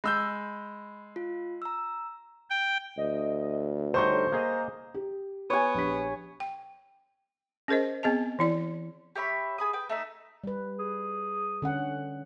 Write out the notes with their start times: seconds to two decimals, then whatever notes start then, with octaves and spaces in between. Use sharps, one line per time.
0.04 G#3 B5 E6 G6
1.16 F4
1.62 A#5 E6
2.50 G5
2.98 D2 D#5
3.94 D3 G3 D#4 C5 C#5 C#6 G6
4.32 A#3 G#4 D#5 A#5
4.94 G4
5.50 B3 C#5 G#5
5.75 A#1 G4 B6
6.40 G5
7.68 C#4 G#4 A#4 C5 D#5
8.03 B3 C4 G#4 D#5 A5
8.39 E3 E4 D5
9.15 G4 C#5 E5 B5
9.58 G#4 B5 D#6
9.73 B4 G5
9.89 A3 D#4 E5
10.44 G3 B4
10.79 G#4
11.62 D3 C#4 F#5